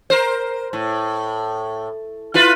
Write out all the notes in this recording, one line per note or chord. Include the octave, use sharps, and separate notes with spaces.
A#4 C5
A2
E4 F4 B4